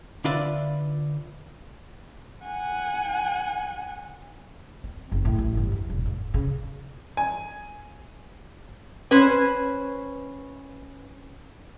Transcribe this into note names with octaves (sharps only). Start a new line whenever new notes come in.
D3 D4 F4 B4 D5 E5
F#5 G#5
C4
F#1
A2
A1
G1
E2
E1
G#2
C#3
G#5
C#4 B4 C5